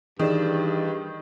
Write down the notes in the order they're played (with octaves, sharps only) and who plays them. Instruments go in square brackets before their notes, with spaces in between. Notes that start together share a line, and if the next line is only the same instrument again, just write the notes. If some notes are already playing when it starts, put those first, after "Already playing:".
[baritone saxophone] G2 [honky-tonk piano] D#3 [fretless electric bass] E3 [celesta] G#4 D5 E7